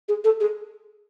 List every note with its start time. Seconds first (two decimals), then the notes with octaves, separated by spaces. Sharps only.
0.09 G#4
0.24 A4
0.40 G#4